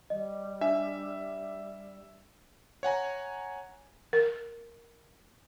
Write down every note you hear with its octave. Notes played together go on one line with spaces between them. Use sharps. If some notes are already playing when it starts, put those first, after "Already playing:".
G3 D#5
D4 E5
C#5 F#5 G#5 A#5
A#4